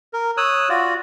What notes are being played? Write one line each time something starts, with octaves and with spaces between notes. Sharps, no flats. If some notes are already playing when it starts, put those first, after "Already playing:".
A#4
C#5 D#6 E6 F#6
F4 F#4 D5